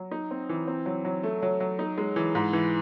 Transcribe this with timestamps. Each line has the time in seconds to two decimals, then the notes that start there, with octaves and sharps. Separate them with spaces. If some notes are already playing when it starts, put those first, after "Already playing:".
Already playing: F#3
0.11 D#4
0.31 C4
0.49 E3
0.68 C4
0.86 F#3
1.05 F#3
1.23 A3
1.42 F#3
1.60 F#3
1.79 D#4
1.98 G#3
2.16 E3
2.35 G#2
2.53 E3